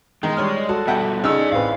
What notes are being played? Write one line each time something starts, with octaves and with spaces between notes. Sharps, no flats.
D#3 G#3
G3 C#5 F6
F#4 A4 A5
G2 B2 E5 F#5 G5
C#3 D#4 D5 G#5 E6
A1 C4 B4 F5